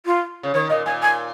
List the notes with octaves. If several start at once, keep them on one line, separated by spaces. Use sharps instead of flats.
F4
C#3
D#3 C#5
A#2 D#5
A#2 G#5
G#5